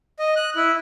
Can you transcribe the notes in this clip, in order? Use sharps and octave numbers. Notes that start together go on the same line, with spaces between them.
D#5
F#6
E4